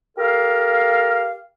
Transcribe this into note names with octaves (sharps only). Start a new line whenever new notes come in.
G4 A4 A#4 F5